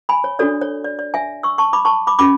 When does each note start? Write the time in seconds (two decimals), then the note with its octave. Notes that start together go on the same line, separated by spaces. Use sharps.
0.09 G#5 B5
0.24 C#5
0.39 D4 F#4 A4 C#5 D5
0.61 C#5
0.84 D5
0.99 D5
1.14 E5 G#5
1.43 C#6 E6
1.58 A5 C#6
1.73 B5 D6
1.85 A5 C#6
2.07 B5 D6
2.19 C#4 F#4 B5 D6